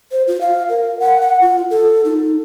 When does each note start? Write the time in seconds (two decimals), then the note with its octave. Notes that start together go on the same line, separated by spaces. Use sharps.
0.12 C5
0.27 F4
0.41 F5
0.69 A#4
1.00 F#5
1.21 F#5
1.41 F4
1.71 A4
2.05 D#4